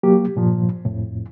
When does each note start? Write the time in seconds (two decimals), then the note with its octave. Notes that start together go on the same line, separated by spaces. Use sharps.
0.03 F#3 A#3 G4
0.36 G2 A#2 F3
0.85 F2 A2